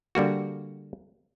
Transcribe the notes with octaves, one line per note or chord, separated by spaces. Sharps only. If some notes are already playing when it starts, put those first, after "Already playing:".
D3 G3 A#3 F#4